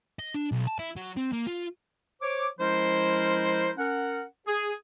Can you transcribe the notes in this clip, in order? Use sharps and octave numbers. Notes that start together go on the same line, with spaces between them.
D#5
D4
B1
A5
E4
F#3
C4
A#3
F4
C5 C#5 D6
F3 G#3 C#4 E4 A#4 C5
C#4 A#4 F#5
G#4